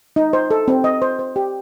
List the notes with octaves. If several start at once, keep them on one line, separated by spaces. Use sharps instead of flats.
D#4
C5
A4
C4
D#5
C5
C5
G4